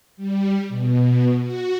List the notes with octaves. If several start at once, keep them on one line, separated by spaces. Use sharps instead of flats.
G3
B2
F#4